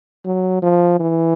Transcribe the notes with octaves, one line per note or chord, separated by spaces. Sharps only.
F#3
F3
E3